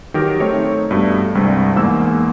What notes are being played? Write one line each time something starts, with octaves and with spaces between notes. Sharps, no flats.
D#3 F#3 G4 A#4
A3 C4 D#4 C#5
G2 B2 A3
C2 G2 G#3 C4
E2 G#2 A#3 E6